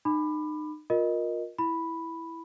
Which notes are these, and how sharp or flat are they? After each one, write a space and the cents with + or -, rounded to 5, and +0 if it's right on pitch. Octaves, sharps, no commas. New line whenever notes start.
D#4 -35 B5 +10 D6 +30
F4 +25 A#4 +10 D#5 +0
E4 +0 B5 +0